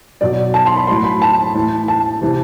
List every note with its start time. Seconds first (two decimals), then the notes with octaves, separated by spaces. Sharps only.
0.21 B2 F#3 D5
0.54 A5
0.66 C6
0.76 B5
0.87 A2 F#3 C6
1.04 B5
1.22 A5
1.54 A2
1.59 E3
1.88 A5
2.21 C3 E3